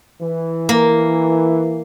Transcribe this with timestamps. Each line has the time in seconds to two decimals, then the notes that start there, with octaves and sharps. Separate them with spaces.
0.21 E3
0.69 A#3